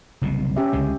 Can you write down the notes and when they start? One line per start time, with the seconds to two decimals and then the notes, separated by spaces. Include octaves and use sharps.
0.22 F#1 C2 B2
0.56 C#4 G4 E5
0.73 C#2 D3 G#3